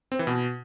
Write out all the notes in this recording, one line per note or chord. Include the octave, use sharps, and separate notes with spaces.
C4
E3
B2